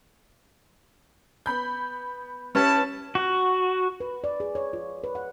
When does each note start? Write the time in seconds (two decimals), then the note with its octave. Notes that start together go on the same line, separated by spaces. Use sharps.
1.46 B3 B5 G6
2.55 C#4 E4 G4 B4 C#5 A5
3.15 F#4
4.00 B4
4.24 D5
4.40 G#4
4.55 C#5
4.73 F4
5.04 B4
5.15 F#5